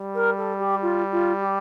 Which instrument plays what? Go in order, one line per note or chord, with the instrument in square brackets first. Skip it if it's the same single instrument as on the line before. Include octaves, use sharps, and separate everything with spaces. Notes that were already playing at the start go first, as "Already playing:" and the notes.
Already playing: [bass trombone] G3
[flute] A#4
A4
G4
F4
F4
G4